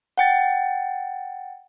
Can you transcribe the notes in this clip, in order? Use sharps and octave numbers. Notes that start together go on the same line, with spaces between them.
F#5 G5 A6